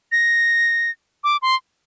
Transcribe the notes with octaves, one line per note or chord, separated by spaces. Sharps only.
A#6
D6
C6